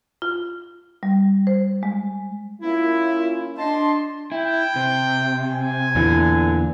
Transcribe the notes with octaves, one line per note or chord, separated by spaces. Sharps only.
F4
G3
C5
G#3
A#3 C#4 E4 F4
D4 D#5 A5 C6
E4 G5
C3
G#5
E2 A#2 D3 E3